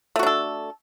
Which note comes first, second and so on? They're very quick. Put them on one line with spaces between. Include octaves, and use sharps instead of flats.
A3 F#4 D4 A4